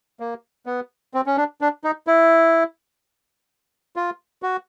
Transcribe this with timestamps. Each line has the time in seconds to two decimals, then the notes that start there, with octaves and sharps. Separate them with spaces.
0.20 A#3
0.66 B3
1.14 C4
1.26 C#4
1.37 D4
1.61 D4
1.84 D#4
2.07 E4
3.96 F4
4.42 F#4